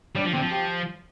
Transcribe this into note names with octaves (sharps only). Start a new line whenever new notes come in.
G3 D4
F3
D3 C4
F3
G4